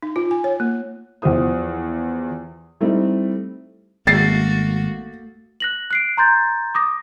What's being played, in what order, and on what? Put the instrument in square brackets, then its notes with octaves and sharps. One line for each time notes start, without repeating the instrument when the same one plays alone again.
[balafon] D#4
F4
G#5
C#5
A#3
[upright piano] E2 F3 G4 C5 D#6
G3 A3 C4 D#4 E4
[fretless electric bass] G#1 [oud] A3 [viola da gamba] A#3 F#4 [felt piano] A6 C7
[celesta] F#6 A#6 F#7
F#6 C7 D7
A#5 C6 G6 A6
D6 D#6 A#6